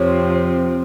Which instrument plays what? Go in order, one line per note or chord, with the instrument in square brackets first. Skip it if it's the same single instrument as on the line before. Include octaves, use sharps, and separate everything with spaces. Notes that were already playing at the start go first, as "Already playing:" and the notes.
Already playing: [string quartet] F2 C3 F3 C4 [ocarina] C#5